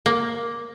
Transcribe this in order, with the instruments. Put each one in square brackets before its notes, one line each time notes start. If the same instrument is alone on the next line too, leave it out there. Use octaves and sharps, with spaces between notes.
[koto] A#3